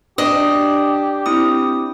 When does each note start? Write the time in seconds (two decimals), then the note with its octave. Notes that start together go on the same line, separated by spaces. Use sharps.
0.18 D4 G4 D#5
1.26 C4 E4 D#6